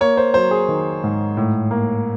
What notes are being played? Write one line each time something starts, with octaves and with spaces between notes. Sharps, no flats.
A#3 C#5
C5
F#3 C5
G#4
D#3
G#2
A2
A#3